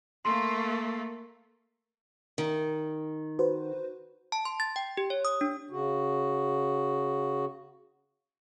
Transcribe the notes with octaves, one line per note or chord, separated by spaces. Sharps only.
A3 A#3 C6
D#3
F#4 B4 C5
A5
C6
A6
G5
G4
C#5
D#6
D4
C#3 F#4